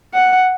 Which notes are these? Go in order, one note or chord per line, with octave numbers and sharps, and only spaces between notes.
F#5